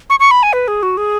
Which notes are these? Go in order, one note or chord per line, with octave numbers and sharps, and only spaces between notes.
C#6
C#6
B5
G#5
B4
G#4
F#4
G#4